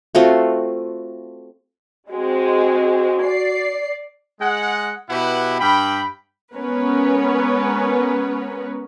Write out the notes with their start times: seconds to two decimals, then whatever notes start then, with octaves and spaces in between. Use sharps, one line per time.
0.15 A3 C4 F4 F#4
2.11 G#3 C4 F#4
3.21 D5 C7
4.40 G#3 F#5
5.10 B2 E4 G4 B4 F#5
5.59 G2 G5 B5
6.56 G#3 B3 C#4 A#4 B4 C#5